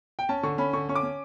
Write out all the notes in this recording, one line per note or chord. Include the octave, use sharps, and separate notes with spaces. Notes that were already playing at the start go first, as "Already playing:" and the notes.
G5
C#4 A5
D3 C#6
C#4 B5
D3 C#6
C#4 C#6
D6
C#4